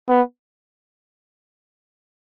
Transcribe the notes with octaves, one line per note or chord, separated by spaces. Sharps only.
B3